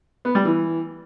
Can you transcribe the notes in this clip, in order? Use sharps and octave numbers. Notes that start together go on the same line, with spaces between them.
B3
G3
E3